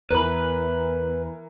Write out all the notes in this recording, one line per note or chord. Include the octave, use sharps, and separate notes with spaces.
E2 E3 A#4 B4 B5